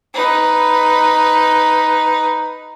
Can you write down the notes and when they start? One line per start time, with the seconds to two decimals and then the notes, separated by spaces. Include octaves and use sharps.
0.14 D#4 B4